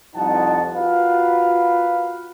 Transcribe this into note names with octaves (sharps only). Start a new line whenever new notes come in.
C2 F2 F3 D#4 F#5 A5
F4 F#4 A#4 B4 F5